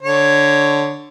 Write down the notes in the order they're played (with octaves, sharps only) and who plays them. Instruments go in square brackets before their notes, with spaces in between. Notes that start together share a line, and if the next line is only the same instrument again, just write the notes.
[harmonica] D3 C#5